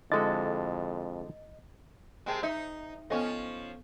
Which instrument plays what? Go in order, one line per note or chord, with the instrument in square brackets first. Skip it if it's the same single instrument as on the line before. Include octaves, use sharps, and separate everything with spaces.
[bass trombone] F2 [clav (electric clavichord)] D3 G#3 F#4 [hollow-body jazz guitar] E4 A4 [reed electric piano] D#5 A6
[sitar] C3 G#3 [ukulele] A#4 G5 A5
[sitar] D#4 [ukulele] E5
[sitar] F3 C#4 [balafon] B3 A4 [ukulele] D#5